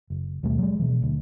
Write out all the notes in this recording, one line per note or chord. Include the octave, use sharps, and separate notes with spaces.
F#1
D#2 B2 G3 A3
F#3 G#3
B2 E3
D2